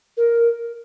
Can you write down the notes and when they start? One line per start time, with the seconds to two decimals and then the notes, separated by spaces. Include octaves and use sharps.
0.17 A#4